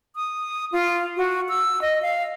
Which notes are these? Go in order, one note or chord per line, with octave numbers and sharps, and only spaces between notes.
D#6
F4
F#4
E6
D#5
F5